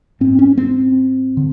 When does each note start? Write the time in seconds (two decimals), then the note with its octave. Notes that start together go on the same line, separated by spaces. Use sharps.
0.20 G#2 C4
0.39 C#4
0.58 C4
1.37 D3